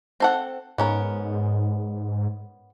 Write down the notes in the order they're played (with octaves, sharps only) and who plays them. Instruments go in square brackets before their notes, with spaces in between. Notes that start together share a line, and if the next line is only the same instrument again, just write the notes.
[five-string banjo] C4 A4 F#5
[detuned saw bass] G#2 [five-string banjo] B3 C#4 A#4